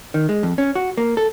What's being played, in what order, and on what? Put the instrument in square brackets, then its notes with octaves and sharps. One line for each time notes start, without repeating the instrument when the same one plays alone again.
[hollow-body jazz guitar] D#3
G#3
F2
C#4
F#4
A#3
A4